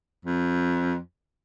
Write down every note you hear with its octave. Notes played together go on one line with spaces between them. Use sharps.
F2